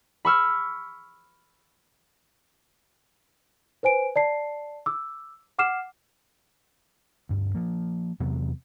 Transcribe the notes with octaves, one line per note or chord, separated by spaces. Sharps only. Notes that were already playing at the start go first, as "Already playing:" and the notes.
B5 C#6 E6 F6
B4 C5 G#5 D7
D5 A5 C7
D6 E6
F#5 D6 F6 C7 E7
D2 G2
F3 A#3
E2 C3 F#3 B3